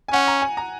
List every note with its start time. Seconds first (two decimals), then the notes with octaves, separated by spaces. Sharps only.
0.08 G#5
0.12 C#4 F#5
0.27 A#5
0.42 G#5
0.57 A#5